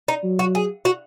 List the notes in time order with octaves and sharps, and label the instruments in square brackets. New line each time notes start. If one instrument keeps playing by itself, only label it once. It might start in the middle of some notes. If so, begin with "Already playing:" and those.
[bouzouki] D#4
[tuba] F#3
[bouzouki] F#4
G#4
F#4